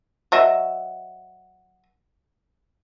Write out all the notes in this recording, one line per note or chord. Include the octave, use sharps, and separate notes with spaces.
F#3 D#5 E5